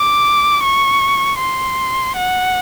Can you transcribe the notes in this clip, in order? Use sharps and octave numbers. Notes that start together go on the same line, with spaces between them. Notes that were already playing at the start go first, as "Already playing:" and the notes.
Already playing: D6
C#6
C6
F#5